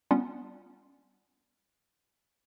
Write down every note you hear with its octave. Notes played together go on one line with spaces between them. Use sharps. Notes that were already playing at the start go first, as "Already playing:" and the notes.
G3 B3 C#4 D4 F4 F#5